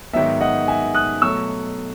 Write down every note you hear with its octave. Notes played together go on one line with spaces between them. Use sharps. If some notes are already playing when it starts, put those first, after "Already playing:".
G#2 D#3 F#3 B3 E5
D#5 F#5
E5 G#5
D#6 F#6
B2 F#3 A3 C#6 E6